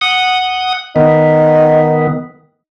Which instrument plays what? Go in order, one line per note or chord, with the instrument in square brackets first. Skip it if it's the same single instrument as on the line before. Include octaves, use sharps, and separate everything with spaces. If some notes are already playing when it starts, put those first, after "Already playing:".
[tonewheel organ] F#5 D#6
[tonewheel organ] D#3 B3 [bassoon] D#4